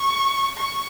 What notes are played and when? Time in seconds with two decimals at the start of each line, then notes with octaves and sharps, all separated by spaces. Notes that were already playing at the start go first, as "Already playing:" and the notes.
Already playing: C#6
0.58 C#6